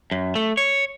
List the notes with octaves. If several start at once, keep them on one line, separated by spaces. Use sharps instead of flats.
F#2
A3
C#5